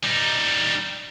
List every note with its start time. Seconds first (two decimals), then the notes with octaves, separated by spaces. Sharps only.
0.04 G3 D#4